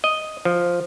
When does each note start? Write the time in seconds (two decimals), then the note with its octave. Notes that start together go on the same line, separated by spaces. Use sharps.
0.04 D#5
0.45 F3